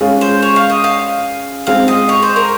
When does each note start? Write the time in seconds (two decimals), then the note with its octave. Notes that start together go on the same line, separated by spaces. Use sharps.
0.01 G#3 C#4 F4
0.21 C5
0.42 C#5
0.56 F5
0.70 D#5
0.84 F5
1.67 G#3 C4 F4 F5
1.88 D#5
2.09 C#5
2.23 C5
2.36 A#4